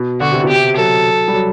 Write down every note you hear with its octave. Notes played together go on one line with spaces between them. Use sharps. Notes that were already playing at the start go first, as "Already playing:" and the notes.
Already playing: B2
D3 F#4
C3
B2
G4
C3
F#3 A4
G3
F#3